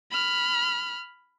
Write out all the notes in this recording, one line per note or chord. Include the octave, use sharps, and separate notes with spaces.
B5 F6